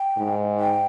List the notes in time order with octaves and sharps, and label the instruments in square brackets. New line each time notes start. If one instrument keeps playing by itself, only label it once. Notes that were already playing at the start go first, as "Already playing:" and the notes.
Already playing: [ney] G5
[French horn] G#2
[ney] G5